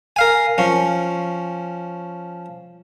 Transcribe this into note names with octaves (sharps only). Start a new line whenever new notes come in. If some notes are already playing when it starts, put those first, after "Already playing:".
A#4 F5 G#5
F3 C#4